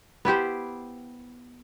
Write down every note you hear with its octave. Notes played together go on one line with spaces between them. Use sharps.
B3 E4 G4 C5